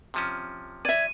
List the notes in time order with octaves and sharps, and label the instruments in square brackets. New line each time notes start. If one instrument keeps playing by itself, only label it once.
[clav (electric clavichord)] C3 F3 C#4
[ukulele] D5 E5 [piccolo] G#6 [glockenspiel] D#7